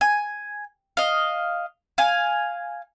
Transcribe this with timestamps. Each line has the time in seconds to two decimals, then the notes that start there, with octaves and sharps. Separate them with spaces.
0.01 G#5
0.97 D#5 F5
1.98 F5 G#5